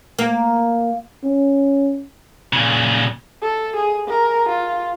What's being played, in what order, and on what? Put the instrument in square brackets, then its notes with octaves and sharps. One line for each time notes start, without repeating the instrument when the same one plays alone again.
[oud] A#3
[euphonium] C#4
[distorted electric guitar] A#2 C#3
[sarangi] A4
G#4
A#4
F4